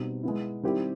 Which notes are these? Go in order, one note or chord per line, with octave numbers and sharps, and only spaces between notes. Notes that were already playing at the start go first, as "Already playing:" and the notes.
Already playing: B2 G3 C4 D#4
G#3 B3 E4
D#3 G3 C4 E4 G4